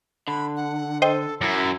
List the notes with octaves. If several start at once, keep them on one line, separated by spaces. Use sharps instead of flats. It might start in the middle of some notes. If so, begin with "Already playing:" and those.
D3 B5
F#5
A4 C5 D#5 G5
F#2 E4